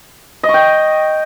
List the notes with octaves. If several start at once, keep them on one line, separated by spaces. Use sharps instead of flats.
D#5
C#6
G5